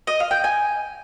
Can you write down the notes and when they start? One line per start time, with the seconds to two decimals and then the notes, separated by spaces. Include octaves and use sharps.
0.07 D#5
0.20 F5
0.31 G5
0.44 G#5